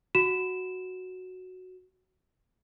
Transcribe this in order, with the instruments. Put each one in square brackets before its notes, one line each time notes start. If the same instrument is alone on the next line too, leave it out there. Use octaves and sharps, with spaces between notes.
[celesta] F#4 E7